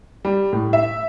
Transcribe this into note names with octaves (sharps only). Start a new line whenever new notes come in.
G3
A2
E5